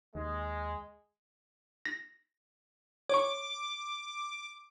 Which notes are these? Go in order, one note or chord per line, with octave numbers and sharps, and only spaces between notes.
D#2 G#3
A#6
C#5 C#6 D6